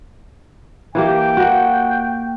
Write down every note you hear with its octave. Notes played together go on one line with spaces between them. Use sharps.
E3 A#3 G4 G5
A#3 F#4